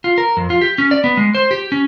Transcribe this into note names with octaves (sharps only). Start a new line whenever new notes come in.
F4
A#4
F2
F4
G4
C#4
D5
B3
G#3
C5
G4
C#4